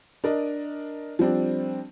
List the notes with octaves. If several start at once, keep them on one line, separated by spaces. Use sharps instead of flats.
D4 A#4 D#5
F3 G3 C4 D4